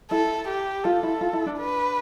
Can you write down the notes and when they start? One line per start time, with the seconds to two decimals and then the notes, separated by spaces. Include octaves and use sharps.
0.11 E4 A4
0.48 G4
0.84 F4 A4
1.03 E4
1.21 F4
1.33 E4
1.46 D4
1.58 B4